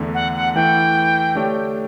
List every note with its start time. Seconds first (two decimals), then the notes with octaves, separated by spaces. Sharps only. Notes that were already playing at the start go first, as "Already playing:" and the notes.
Already playing: E2 D3 A3
0.14 F#5
0.36 F#5
0.55 E3 A3 E4 G5
1.35 D3 A3 D4 G4 C#5